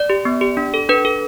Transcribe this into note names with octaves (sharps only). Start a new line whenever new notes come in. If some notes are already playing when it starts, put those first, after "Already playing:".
Already playing: D5
G4
B3
G4
D4
A4
D4 B4
A4